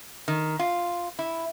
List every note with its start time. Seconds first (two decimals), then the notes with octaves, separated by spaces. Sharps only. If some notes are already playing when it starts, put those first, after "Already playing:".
0.28 D#3
0.59 F4
1.19 E4